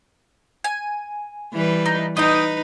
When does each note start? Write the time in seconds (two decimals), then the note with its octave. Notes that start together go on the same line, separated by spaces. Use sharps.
0.64 G#5
1.53 E3 G3 B4
1.86 D#4
2.17 D#4 B4 D#5 G5